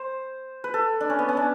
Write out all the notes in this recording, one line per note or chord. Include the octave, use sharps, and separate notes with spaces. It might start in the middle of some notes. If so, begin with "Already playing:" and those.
Already playing: C5
B4
A4
D4
C#4
B3
C#4
D4